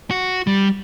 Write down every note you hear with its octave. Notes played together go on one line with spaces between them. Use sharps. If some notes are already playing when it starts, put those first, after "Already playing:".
F#4
G3